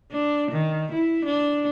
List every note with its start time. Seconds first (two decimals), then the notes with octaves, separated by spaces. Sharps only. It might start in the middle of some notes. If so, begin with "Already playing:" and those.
0.11 D4
0.51 D#3
0.92 E4
1.25 D4